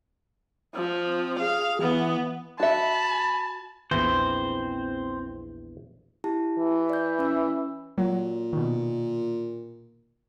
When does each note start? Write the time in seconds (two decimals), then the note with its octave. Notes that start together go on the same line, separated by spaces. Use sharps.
0.75 F3
1.06 C4
1.40 G#4 F5
1.81 E3 B3
2.60 F#4 E5 A5 B5
3.91 A#1 E2 E3 C4 C5
6.24 E4 G4 A5
6.59 E3
6.90 D5 G6
7.19 C#4 E6
7.98 A#2 F#3
8.53 B2 D#3